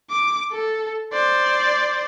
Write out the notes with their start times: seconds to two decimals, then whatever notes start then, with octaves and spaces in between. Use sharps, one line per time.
0.11 D6
0.52 A4
1.13 C5 D5